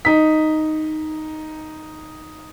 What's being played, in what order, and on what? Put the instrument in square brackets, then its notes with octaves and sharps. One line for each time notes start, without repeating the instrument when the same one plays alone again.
[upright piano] D#4 B6